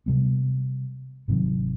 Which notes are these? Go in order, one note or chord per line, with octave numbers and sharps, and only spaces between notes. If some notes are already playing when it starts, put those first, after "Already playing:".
C3 G3 B3
G#1 C3 D#3 F#3